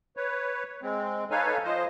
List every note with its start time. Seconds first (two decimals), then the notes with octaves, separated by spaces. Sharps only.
0.17 B4 C#5
0.82 G#3 C4
1.31 D#4 A4 B4 C#5 F5 G#5
1.64 F3 C5 D#5